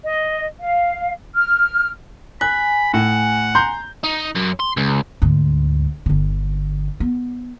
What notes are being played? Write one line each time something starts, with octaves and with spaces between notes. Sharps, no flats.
D#5
F5
F6
G#5 B5 F#6
A2 F#5
A#5 C6 G6
D#4
F#2
C6
C#2
D2 G#2
G1 D3
B3